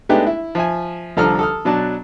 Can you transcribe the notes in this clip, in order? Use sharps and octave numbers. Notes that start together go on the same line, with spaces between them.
G#3 A3 B3 D4 D#4 G4
E4
F3 E5 G#5
C2 D3 F3 A4 A#5 F6
A4 D#6 F6
B2 F#3 D4 A5